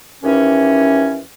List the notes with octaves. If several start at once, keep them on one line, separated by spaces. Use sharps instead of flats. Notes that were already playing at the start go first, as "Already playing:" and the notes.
D#2 E3 C#4